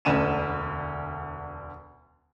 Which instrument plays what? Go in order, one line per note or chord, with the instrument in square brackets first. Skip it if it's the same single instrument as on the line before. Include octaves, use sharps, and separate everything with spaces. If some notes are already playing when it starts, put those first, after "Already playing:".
[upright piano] E1 D2 D3 C#4 D#7 E7